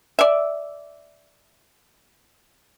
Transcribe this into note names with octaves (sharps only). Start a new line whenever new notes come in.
D5 E5